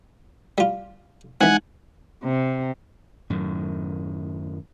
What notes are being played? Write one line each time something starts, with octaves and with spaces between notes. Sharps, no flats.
G3 F4
E3 G#3 C4 D#4 F#5 G#5
C3
F#2 A2 D#3